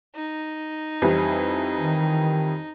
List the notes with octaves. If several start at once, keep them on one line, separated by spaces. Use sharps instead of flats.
D#4
F2 E3 G3
D#3